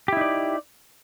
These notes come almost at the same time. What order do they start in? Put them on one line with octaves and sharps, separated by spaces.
G4 E4 D#4 D5